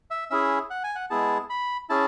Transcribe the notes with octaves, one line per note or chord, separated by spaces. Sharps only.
E5
C#4 E4 G#4 E5
F#5
G#5
F#5
G#3 B3 E4 G#4 A5
B5
C#4 E4 G#4 A5